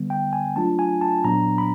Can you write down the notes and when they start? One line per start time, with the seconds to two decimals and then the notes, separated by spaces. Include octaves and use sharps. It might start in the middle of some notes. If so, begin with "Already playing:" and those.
Already playing: D3 G3 B3
0.10 G5
0.33 G#5
0.56 F#3 A3 D4 F4 A5
0.79 G#5
1.01 A5
1.24 A#2 F#3 B3 D4 A#5
1.58 B5